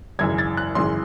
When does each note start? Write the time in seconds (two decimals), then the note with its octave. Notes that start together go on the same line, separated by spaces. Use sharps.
0.19 G#1 F#2 C#3 E3 G#6
0.38 A6
0.57 F#6
0.75 G#1 F#2 C#3 E3 C6